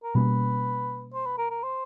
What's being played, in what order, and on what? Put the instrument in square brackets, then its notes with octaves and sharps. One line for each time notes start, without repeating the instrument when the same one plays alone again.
[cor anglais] A#4
[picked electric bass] B2 G3 A#3 C#4 [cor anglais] B4
[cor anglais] C5
B4
A#4
A#4
C5